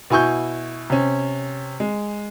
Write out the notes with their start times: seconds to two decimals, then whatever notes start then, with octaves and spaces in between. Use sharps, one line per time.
0.10 B2 E4 G#5 C#6 G6
0.90 C3 C#4
1.80 G#3